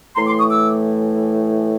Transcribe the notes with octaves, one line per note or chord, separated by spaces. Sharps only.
A2 E3 A3 A#5 C6
C6 D6
C#6 D#6
D6 E6